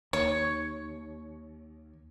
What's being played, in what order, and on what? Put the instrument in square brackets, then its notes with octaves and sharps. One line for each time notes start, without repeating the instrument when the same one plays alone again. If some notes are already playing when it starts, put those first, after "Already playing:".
[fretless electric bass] D#2 [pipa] C#5